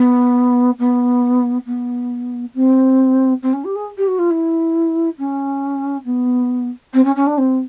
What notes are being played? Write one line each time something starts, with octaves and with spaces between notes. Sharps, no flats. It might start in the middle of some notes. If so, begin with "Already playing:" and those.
Already playing: B3
B3
B3
C4
C4
C#4
G4
G#4
G4
F#4
F4
E4
C#4
B3
C4
C#4
C#4
D4
C4